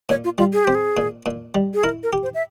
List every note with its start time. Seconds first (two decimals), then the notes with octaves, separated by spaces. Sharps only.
0.09 A#2 C#5
0.24 F4
0.38 G3 F4
0.53 G#4
0.64 C4 G4
0.75 G#4
0.97 A#2
1.26 A#2
1.55 G3
1.74 G#4
1.84 E4 A#4
2.03 A#4
2.13 G4
2.23 C5
2.34 E5